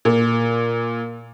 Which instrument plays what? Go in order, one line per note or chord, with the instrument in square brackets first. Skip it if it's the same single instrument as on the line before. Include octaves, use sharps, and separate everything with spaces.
[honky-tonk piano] A#2